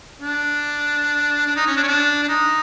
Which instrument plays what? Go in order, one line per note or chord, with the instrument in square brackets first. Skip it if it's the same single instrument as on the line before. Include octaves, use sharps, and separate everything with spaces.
[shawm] D4
D4
D#4
C#4
D4
C#4
D4
D4
D#4